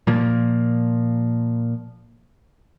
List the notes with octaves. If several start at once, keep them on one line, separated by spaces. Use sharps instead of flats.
A#2 F3 A#3